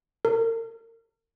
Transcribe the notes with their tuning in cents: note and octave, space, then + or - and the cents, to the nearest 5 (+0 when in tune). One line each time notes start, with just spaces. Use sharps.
A#4 -40